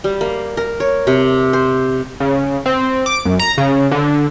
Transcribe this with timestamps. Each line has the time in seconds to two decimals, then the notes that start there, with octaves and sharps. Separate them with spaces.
0.04 G3
0.21 A#3
0.57 A#4
0.80 C#5
1.07 C3
1.53 C5
2.20 C#3
2.66 C4
3.06 D6
3.25 F#2
3.39 A#5
3.58 C#3
3.91 D3